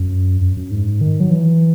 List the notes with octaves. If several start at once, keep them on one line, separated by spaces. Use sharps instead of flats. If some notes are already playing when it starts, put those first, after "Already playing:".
Already playing: F#2
F#2
F#2
G#2
D#3
F#3
E3